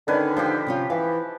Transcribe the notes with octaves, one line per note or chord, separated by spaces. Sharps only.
D3 D#3 C#4 B4 G#5
F3 D#4 G4 C5
C3 C#4 F4
E3 F5